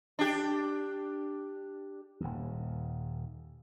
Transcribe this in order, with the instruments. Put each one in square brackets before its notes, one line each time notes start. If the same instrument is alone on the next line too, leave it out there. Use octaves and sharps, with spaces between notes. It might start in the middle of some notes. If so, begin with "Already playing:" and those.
[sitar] D4 G4
[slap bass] D#1 D#2